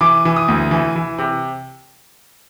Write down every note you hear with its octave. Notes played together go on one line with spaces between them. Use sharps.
E3 D6
E3
D#6
D2
E3
E3
C3